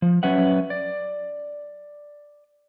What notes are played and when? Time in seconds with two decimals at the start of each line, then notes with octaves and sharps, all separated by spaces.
0.02 F3
0.23 F#3 C#4 B4 E5 F#5
0.70 D5